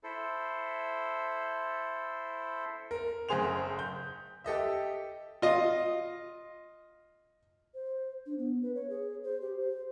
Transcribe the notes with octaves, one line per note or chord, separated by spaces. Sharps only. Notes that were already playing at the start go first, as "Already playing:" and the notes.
E4 A4 C5
A#4
F#1 A3 G#4 C5 F7
G6
G4 A4 D#5 E5
F4 D#5
C5
D4
B3
B4
C#5
G#4
C5
G4
C5